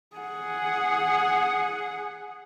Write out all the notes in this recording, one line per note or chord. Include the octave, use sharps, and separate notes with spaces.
G#4 F#5